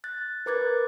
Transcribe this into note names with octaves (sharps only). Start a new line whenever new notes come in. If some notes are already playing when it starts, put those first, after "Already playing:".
F#6 A6
A#4 B4 D6 F#6 G#6 A6